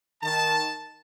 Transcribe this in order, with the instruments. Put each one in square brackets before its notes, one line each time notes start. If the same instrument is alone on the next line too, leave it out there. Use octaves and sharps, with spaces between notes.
[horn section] D#3 A5